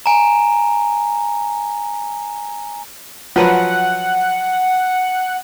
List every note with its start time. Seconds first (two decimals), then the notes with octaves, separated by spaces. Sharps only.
0.06 G#5 A#5
3.36 F3 F#3 B4 F#5